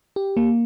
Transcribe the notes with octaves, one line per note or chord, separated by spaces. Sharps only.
G4
A#3